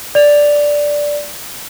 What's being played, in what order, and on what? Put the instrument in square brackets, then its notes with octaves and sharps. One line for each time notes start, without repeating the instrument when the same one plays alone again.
[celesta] D5 F7